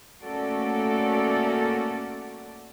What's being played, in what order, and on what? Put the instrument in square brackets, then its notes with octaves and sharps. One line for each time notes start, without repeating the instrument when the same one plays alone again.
[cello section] A3 A#3 C#4 F#4 A4 D5